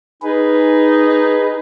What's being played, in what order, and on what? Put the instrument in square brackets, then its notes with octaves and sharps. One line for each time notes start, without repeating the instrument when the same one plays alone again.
[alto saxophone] D#4 [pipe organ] G#4 B4